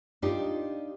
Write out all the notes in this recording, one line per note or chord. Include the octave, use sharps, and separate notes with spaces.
D4 D#4 F4 G4